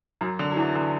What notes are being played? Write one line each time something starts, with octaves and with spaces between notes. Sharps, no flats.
F#2 F#3
D3
F#3
E2 E3
D3